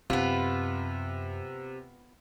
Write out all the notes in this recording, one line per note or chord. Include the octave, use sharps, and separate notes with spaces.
F#2 C3 B3 F4